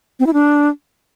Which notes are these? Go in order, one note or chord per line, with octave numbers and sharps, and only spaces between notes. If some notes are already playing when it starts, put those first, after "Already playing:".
C4
E4
D4